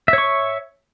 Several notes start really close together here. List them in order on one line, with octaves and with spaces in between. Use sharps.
E5 C#5 C#6